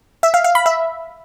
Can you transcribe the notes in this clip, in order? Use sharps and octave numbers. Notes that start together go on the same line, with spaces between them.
E5
F5
F5
B5
E5